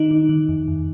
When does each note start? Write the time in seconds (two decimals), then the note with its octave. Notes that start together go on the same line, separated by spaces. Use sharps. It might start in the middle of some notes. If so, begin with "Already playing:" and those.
Already playing: D#3 D#4
0.11 D#3
0.29 D#3
0.49 F2
0.68 F2